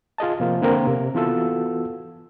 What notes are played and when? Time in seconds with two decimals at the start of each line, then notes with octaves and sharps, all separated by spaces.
0.18 F4 G#4 D#5 A5
0.40 C3 F3 A#3 C4 F4
0.62 D3 A#3 C4 A#4
0.87 C3
1.15 E3 B3 F4 F#4 A4 E6